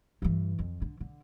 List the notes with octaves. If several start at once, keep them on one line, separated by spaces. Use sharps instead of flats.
G2 E3
F2
D3
D3